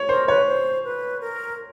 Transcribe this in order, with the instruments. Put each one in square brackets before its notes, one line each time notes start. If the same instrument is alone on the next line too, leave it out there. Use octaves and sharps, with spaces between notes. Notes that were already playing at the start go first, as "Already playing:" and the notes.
Already playing: [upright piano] C#5
[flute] A#4 [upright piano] C5
[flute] B4 [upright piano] C#5
[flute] C5
B4
A#4